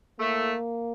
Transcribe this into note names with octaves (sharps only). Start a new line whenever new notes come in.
A2 A3 A#3